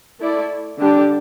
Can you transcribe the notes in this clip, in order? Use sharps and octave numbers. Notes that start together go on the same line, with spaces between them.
A3 E4 A4 D5
D3 G3 D4 G4